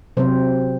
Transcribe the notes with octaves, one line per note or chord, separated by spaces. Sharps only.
C3 F#3 C4 C5